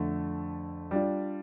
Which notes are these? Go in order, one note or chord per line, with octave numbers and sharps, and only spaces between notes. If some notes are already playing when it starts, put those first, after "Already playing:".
Already playing: F2 D3 A3
G3 D4 F4